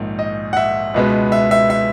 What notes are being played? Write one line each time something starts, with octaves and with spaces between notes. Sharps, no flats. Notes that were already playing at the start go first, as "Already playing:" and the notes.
Already playing: A#1 G#2 D#3
D#5
F#5
E5
C#2 B2 G#3 B3
E5
E5
E5